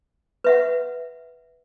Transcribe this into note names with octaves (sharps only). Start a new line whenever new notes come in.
B4 E5 F#5